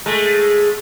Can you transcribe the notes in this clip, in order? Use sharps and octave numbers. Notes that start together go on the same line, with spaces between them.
G#3 A3